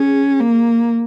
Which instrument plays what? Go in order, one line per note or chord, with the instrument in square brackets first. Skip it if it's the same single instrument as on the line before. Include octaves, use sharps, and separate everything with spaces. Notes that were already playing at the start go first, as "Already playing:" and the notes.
Already playing: [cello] C#4 [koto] G#4
[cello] A#3